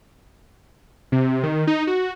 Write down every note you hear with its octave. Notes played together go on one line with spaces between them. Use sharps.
C3
D#3
D#4
F#4